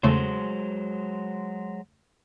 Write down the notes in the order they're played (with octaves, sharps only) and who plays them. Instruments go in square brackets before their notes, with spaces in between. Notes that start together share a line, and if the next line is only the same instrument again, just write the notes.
[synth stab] E2 C#3 A3 [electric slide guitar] F#3 G#3 C5